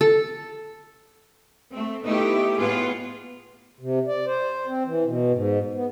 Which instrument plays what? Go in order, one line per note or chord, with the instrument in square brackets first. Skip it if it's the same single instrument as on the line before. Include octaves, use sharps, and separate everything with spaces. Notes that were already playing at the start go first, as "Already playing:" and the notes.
[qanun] A4
[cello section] A3 C4
A3 B3 D#4 E4 G4
A2 B3 F4 G#4
[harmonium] C3
D5
C5
C4
E3
B2
G#2
B3